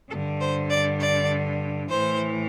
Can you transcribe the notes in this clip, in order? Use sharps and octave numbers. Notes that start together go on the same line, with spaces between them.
G2 D3 A4
C5
D5
D5
A2 E3 C5